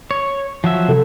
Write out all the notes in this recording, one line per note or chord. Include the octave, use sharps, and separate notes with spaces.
C#5
F3 F#3 E5
C3 A4